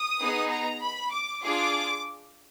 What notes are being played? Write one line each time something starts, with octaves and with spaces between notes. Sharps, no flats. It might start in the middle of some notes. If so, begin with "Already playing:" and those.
Already playing: D#6
B3 D#4 G#4
A#5
B5
D6
D4 F4 G#4 D6